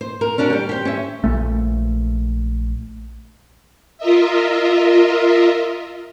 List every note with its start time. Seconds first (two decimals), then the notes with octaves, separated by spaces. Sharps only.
0.01 C5
0.21 A#4
0.38 C#4 D4 F#4 A#4
0.50 G3 G4
0.69 G4 C5
0.85 C#4 E5
1.24 A#1 A3
3.98 F4 A#4 D#5 E5